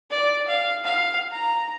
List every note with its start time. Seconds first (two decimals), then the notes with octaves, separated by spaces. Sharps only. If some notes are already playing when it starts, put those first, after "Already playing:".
0.11 D5
0.48 F5
0.84 F5
1.32 A#5